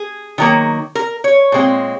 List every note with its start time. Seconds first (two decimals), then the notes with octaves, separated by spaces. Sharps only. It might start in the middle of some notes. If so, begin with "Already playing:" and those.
Already playing: G#4
0.38 D#3 F#3 A#3
0.95 A#4
1.24 C#5
1.52 A#2 G#3 C4